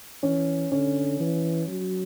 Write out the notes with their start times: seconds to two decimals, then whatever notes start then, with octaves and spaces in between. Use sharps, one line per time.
0.23 E3 C#4
0.71 D3 C#4
1.20 E3
1.68 F#3